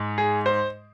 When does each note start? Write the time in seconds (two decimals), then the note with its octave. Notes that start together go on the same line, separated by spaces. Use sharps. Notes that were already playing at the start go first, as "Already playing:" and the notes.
Already playing: G#2
0.18 G#4
0.46 C5